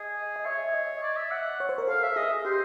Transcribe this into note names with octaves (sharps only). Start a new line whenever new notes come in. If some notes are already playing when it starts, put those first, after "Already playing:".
Already playing: G#4 D#5
D#5
C#5 E5
D#5
D5
E5
F#5
C#5
C5
A#4
A4 F5
E5
G#4 D#5
G4 C5